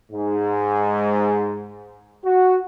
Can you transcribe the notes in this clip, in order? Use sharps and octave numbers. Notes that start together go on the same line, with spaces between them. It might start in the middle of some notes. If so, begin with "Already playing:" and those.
G#2
F#4